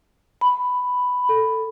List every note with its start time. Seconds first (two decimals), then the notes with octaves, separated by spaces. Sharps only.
0.41 B5
1.29 A4